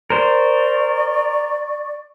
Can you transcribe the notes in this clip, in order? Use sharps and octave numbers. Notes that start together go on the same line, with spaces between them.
A#4 C5 D5 C#6